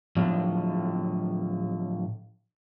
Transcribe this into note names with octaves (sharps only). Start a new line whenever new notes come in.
A2 D3 F3 F#3